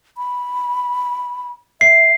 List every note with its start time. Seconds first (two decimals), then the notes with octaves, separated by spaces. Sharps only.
0.17 B5
1.81 E5 C7